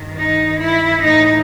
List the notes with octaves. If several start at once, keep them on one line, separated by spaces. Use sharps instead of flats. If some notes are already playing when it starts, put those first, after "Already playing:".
Already playing: G2 D#3
D#4
E4
A2 E3 D#4